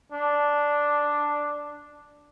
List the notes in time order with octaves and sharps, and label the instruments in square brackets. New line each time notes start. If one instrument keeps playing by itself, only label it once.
[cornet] D4